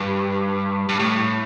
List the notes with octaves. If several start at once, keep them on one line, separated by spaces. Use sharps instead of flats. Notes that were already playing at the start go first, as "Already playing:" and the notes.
Already playing: G2
G2
A2